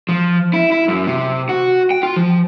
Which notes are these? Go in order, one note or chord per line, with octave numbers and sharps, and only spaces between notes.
F3
E4
E4
F#2
C3
F#4
G5
F4
F3